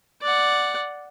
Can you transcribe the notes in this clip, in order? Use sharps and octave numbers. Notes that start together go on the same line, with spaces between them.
D5 F#5